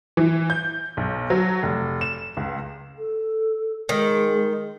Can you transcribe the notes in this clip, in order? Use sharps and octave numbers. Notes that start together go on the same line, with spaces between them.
E3
G6
B1
F#3
F1
E7
C#2
A4
D#3 G#3